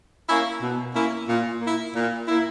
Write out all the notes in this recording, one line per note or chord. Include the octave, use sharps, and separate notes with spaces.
A#3 C#4 E4
B2
A#3 C#4 E4
A#2
A#3
E4
A#2
A#3 E4